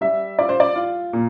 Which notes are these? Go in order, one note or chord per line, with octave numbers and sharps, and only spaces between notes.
G3 E5
F4 D5
C5
D5
F4
A#2